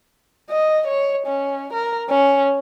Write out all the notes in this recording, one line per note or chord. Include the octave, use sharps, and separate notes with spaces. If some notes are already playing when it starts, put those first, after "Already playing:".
D#5
C#5
C#4
A#4
C#4